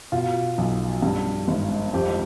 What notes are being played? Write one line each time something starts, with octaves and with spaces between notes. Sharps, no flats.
B2 F4
B1
G2
G#1
F2 G4